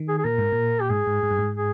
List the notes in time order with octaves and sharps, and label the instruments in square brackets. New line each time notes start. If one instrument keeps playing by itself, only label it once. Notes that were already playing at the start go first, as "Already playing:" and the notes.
Already playing: [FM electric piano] D#3
[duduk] G#4
G#4
[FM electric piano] A#2 [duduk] A#4
[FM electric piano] G#2
A#2
[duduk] G4
[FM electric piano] G#2 [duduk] G#4
[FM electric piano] G#2
G#2
G2
G#2
[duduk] G#4